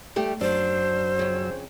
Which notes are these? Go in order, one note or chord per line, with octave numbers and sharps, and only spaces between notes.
G3 A3 G4
F#2 F#3 D4 C5 E6
F2 C#3